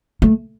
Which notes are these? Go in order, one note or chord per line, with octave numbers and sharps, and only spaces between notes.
A3